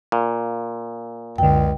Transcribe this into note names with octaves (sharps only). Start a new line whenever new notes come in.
A#2
C#2 F#2 D3 G5